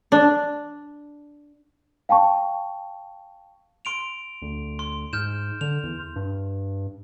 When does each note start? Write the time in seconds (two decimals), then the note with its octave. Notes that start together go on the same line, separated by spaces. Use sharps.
0.12 D4
2.09 F5 G5 A5 C#6
3.85 C6 D7 F7
4.42 D2
4.79 C6
5.13 G#2 F6 G6 E7
5.61 D3 F7
5.83 E2
6.16 G2